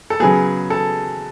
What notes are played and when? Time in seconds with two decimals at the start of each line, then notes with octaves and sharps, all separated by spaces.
0.10 A4
0.20 C#3 F#3 B3 G#4
0.70 A4